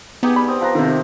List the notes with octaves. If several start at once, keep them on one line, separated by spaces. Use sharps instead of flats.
B3 D#4 G4 G#4
G3 B5
C4 D#6
F3 B4 A#5
C3 D#3 A4